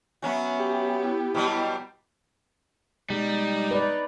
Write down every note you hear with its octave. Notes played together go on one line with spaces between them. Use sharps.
F#3 B3 C#4 F#4 E5 G#5
G4
E4
B2 F#3 G3
B2 G3 G#3 D#4
B4 D5